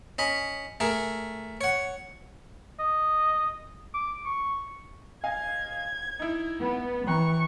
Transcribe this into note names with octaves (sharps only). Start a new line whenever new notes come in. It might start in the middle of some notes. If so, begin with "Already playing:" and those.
C#4 D#5 B5
A3 G#4 A#4
C#5 F#5
D#5
D6
C#6
D#5 F5 G#5 G#6
D#4 E4
B3
E3 G5 A#5 C#6 F#6